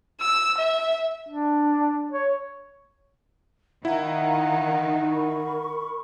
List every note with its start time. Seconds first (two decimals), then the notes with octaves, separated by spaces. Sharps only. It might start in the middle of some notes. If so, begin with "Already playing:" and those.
0.21 E6
0.58 E5
1.29 D4
2.11 C#5
3.85 D#3 D#4 E4 F5 F#5 A#5
5.08 A#4 B5 C#6